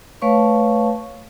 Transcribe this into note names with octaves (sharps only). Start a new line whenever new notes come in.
A3 B4 C#5 F5 A5 C#6